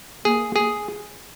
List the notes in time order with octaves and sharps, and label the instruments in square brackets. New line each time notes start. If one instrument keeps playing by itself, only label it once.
[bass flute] A#3 [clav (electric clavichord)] G#4
[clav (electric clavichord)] G#4